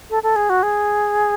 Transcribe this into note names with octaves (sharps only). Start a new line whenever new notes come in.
A4
A4
G#4
F#4
G#4